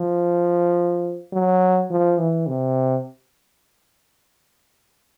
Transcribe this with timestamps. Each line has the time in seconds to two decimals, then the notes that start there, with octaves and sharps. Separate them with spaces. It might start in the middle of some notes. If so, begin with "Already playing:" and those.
Already playing: F3
1.33 F#3
1.90 F3
2.18 E3
2.47 C3